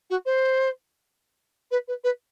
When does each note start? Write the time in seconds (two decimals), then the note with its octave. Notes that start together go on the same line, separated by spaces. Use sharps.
0.10 F#4
0.26 C5
1.71 B4
1.88 B4
2.04 B4